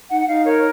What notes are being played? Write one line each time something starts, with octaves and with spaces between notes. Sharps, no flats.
D#4 F#5
F#5
D#4 F5
A#4 C#5